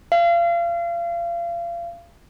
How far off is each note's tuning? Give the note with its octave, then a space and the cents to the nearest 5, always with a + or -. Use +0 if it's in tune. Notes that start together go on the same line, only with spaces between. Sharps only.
F5 -30